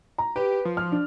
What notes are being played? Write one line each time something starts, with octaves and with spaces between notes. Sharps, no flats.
A#5
G4 B4
F3
F6
D4